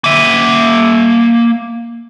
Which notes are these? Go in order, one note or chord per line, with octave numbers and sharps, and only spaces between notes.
A#3 E5